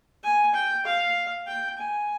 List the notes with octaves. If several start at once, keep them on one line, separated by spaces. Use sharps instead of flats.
G#5
G5
F5
G5
G#5